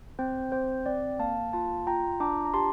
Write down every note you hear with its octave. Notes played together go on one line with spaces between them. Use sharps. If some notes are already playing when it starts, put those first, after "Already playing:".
C4 C5
C4 C5
C4 D5
A#3 F5 A5
F4 F5 A5
F4 G5 A#5
D4 A#5 D6
A#5
G4 A5 C6